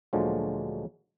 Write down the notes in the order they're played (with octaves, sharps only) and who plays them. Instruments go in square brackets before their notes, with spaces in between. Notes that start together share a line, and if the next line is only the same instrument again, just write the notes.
[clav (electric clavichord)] D2 A#2 D3 F3 F#3 G#3